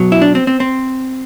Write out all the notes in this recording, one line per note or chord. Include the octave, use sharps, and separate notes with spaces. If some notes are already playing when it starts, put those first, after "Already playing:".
Already playing: B2 F#3
E4
D4
C4
C4
C4